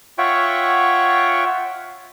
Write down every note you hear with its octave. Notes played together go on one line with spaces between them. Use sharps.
F4 C#5 E5 F#5 G5 C#6